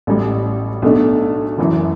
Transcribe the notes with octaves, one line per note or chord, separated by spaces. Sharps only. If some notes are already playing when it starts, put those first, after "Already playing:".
A1 A2 G3
B1 B2 A3 D4
F#1 F#2 E3